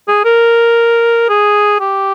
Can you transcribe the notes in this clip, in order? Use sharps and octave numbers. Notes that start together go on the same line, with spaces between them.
G#4
A#4
G#4
G4